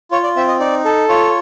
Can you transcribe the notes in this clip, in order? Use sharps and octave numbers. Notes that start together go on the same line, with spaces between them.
F4 C#5
D5
C4 E5
D#5
D#4 D5
A4
F4 C#5